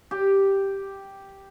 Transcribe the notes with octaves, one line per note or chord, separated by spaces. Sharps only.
G4